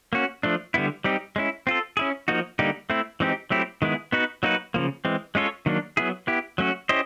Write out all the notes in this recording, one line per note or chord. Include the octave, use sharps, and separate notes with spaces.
A#3 C#4 F#4
F3 A3 D4
D3 G3 B3 E4
G3 C4 D#4 G4
G#3 C#4 E4
C4 F4 A4
C#4 E4 G#4
F3 A#3 D#4 F#4
D3 G3 A#3 D#4 G4
A3 C4 E4
E3 G#3 C4 D#4 G4
F#3 A3 C4 E4 G4
D#3 G#3 B3 E4 G#4
B3 D#4 F#4 B4
F#3 A#3 D#4 F#4 B4
C#3 F3 A#3
E3 G#3 C4
G#3 C#4 F4 A4 C#5
D#3 F#3 A#3 D4
F#3 B3 E4 G#4
B3 E4 G4
F#3 A3 C#4 F#4
C#4 E4 G4 C5 D#5